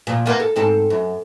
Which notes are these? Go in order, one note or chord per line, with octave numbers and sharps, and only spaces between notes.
A#2 F3
A#3 B3 F4
A4
G#2 C4 A4
F#2